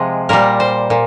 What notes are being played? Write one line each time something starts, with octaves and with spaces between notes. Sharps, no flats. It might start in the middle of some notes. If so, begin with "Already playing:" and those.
Already playing: C3 F3 G#3
A#2 G3 A#4
C5
A#2